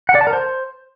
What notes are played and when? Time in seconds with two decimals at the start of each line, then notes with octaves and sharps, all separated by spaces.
0.09 F#5
0.15 D5
0.21 A5
0.27 A#4
0.33 C5